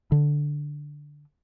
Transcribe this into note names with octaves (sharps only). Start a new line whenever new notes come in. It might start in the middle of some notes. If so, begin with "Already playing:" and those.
D3